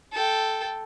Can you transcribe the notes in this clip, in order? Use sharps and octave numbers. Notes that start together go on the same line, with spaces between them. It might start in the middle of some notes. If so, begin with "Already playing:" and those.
A4 G5